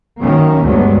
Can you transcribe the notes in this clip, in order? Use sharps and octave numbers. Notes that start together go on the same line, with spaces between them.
F#2 D#3 A#3 C#4
D2 G2 F#3 G#3 B3